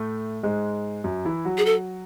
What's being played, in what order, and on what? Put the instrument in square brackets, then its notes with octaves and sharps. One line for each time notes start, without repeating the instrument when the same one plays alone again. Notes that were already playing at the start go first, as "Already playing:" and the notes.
Already playing: [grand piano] A2 A3
G#2 G#3
F#2 F#3
E3 E4
F#3 F#4
[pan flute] G#4
A4